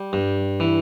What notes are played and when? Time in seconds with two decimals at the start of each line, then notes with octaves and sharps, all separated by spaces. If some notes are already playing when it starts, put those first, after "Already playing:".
Already playing: G3
0.13 G2
0.60 E3